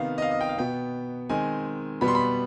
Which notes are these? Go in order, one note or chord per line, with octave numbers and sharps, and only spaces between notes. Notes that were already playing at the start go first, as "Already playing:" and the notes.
Already playing: C3 D#3 B3 F5
D#5
F5
D#5
G5
F5
B2 B3 G5
D#3 G#3 C4 G#5
B2 G3 B3 B5
C6
B5